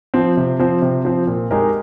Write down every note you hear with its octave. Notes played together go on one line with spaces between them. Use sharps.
F3 C4
C3
F3 C4
C3
F3 C4
A#2
G#3 D#4 G4 A#4